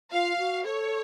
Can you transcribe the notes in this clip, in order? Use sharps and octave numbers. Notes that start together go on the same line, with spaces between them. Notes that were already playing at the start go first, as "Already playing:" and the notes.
F4 F5
F#4
A4 C#5